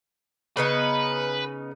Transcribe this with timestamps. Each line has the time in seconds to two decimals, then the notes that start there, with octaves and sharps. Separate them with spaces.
0.57 C#3 B3 D#4 B4